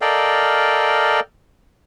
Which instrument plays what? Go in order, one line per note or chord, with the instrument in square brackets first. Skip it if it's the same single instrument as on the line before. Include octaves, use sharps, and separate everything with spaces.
[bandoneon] A4 A#4 D5 D#5 F5 G5